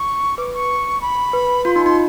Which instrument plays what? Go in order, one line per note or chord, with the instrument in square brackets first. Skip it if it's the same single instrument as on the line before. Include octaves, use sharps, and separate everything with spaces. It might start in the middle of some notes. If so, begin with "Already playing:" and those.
Already playing: [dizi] C#6
[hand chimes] B4 [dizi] D6
[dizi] C#6
B5
[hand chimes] B4
[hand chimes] F4 [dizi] C6
[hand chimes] D#4 [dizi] C6
[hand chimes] D#4 [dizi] C6